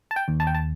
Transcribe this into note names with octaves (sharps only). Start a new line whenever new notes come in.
A5
G5
D#2
A5
G5
A5